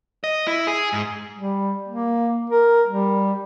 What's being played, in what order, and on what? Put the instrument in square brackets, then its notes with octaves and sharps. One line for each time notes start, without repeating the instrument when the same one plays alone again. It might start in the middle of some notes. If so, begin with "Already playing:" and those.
[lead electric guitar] D#5
E4
G#4
G#2
[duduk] G3
A#3
A#4
G3